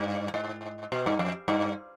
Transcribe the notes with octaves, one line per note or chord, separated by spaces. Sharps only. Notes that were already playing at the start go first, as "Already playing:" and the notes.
Already playing: G2
G#2
B2
G2
F2
G2